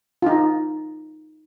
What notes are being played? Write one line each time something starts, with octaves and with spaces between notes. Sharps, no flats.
D#4 F4